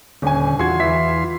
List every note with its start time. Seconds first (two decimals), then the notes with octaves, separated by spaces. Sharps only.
0.22 D#1 D3 C#4 G#5
0.59 E2 F4 F#4 C6 G#6
0.80 E3 E5 B6